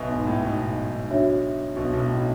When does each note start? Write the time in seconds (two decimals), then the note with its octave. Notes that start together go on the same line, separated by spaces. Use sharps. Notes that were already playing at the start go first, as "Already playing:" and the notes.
Already playing: B1 B2 B4 E5 G#5
0.09 G#2
0.27 A2
0.43 B1 B2
1.10 D4 F#4 C#5 E5
1.76 B1 B2
1.93 B1 B2
2.10 A2